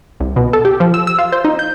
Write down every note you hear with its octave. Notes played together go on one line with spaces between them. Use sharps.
C2
B2
A4
G4
F3
E6
E6
F4
C5
D#4
G6